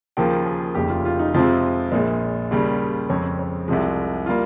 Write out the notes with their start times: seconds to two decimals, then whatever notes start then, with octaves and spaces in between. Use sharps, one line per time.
0.17 D#2 C#3 F3 A#3 G5
0.46 G#4
0.75 F1 D#2 C#3 G4
0.90 F4
1.05 F4
1.19 D#4
1.34 F2 C3 F3 G#3 C4 F4
1.92 A#1 A#2 G#3
2.51 D#2 C#3 G3
3.10 F2 C#3 G#3 C4 C#5
3.39 C#5
3.68 C2 C3 F3 G#3
4.26 G3 A#3 F4